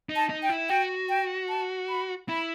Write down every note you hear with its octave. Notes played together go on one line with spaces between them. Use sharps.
D#4
A5
D#4
G5
E4
F#4 G5
G5
A5
B5
E4 B5